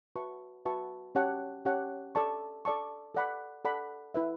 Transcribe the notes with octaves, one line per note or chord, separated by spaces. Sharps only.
F#4 B4 E5 A5 C#6
F#4 B4 E5 A5 C#6
C#4 G4 C#5 F#5 A5
C#4 G4 C#5 F#5 A5
A4 D5 A5 C#6
A4 D5 A5 C#6
A4 D5 F#5 B5
A4 D5 F#5 B5
E4 B4 E5